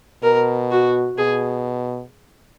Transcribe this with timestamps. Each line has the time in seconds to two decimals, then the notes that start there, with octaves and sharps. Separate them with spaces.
0.23 B2 A#4
0.71 F#4
1.17 B2 G#4